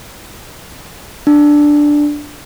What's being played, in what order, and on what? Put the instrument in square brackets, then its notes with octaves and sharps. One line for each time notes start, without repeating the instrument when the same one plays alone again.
[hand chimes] D4